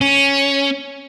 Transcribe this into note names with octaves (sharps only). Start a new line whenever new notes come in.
C#4